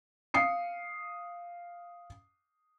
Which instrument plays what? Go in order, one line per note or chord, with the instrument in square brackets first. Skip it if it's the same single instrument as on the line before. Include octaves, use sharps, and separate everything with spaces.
[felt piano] F5 D#6 C7 C#7